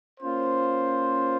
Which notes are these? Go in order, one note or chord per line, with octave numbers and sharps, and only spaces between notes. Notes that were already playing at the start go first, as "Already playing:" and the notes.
A#3 C#4 F4 C5